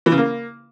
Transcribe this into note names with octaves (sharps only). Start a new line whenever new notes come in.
E3
C#3
A#3